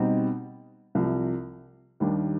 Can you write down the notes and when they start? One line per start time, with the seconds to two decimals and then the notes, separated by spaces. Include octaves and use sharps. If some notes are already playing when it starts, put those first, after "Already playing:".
Already playing: B2 G3 C4 D#4
0.95 C2 C3 F3
2.00 D#2 D#3 G3 D4